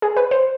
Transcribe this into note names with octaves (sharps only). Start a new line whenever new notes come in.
G#4
B4
C5